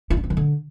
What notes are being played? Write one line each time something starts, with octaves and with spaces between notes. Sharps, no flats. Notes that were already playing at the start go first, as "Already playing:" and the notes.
F4
D4
C4
D#3
D3